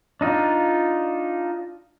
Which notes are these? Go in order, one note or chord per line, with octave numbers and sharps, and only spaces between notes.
D4 D#4 F4